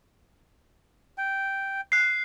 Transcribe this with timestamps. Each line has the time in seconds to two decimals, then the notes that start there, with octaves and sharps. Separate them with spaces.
1.18 G5
1.92 F#6 C7